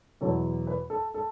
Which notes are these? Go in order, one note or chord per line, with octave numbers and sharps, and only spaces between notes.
E2 B2 F#3 A4 C#5
B4
A4
A4